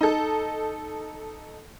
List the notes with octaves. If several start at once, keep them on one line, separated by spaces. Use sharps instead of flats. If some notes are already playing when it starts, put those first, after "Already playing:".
D#4 A4